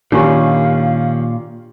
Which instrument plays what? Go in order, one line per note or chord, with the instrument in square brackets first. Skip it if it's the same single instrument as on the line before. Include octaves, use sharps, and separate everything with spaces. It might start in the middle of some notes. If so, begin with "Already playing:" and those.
[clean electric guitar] A#2 [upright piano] D#3 C#4 [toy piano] D4 F4 G4 [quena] F5